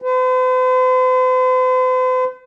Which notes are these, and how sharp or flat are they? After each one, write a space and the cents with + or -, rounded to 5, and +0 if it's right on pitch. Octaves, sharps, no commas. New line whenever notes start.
C5 -45